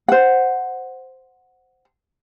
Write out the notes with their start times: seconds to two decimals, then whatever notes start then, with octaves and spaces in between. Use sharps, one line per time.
0.08 C5 F#5